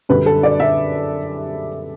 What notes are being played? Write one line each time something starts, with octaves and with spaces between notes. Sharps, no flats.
F#2 D3 G3 B4
A4
D5
E5